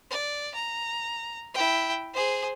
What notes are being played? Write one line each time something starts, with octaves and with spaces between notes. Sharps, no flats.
D5
A#5
E4 G5
G#4 C5